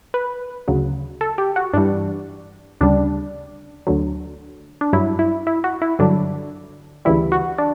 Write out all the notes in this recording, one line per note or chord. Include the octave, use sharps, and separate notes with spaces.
B4
D2 C#3 F#3
A4
G4
F#4
G2 E3 G3 D4
D2 C#3 G3 D4
D2 D3 F#3
D4
G2 F#3 E4
E4
E4
F#4
E4
G2 D3 F#3 D4
D2 C#3 E3 G3 E4
F#4
D4